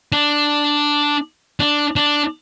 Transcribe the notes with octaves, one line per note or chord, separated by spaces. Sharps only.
D4
D4
D4